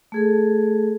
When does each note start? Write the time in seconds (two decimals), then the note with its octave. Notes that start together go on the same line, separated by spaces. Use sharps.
0.12 A3 G#4 A4